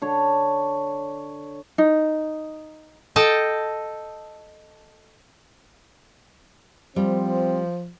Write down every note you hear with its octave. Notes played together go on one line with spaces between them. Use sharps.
D3 C#5
D#4
A4 D#5 G5 A5
F3 G3 C4